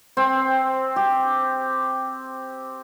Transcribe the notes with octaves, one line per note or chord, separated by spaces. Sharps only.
C4
G4